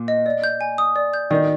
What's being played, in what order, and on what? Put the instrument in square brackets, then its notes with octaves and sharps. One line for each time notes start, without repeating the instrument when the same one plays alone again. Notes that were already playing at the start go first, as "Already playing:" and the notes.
Already playing: [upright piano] A#2
[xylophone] D#5
D5
G6
G#5
D#6
D5
G6
[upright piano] D#3 D#4 [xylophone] D5